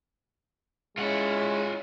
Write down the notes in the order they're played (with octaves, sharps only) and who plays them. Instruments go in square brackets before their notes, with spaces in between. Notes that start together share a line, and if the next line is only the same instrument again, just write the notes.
[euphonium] G#3 [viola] C#4 E4 [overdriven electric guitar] F4 F#5